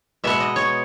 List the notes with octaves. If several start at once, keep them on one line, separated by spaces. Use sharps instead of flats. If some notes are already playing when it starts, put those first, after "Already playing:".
B2 G#3 B3 E5
D#5
C#5